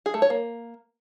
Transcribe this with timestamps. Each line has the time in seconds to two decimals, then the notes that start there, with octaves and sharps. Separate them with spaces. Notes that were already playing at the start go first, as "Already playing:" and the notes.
0.06 G#4
0.14 A3
0.22 C#5
0.30 A#3